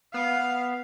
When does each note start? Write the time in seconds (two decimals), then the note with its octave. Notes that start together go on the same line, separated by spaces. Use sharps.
0.14 B3 F5